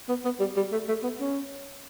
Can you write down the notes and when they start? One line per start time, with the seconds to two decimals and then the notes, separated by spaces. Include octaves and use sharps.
0.09 B3
0.25 B3
0.39 G3
0.56 G3
0.72 A3
0.88 A3
1.03 B3
1.20 C#4